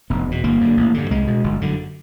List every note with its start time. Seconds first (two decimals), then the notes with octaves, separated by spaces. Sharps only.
0.10 F1 B3
0.27 E2 B2
0.44 G1 A#3
0.61 F#2 D3
0.77 A1
0.94 G2 D3
1.10 C2 G#3
1.27 B2
1.44 G1
1.61 F#2 D3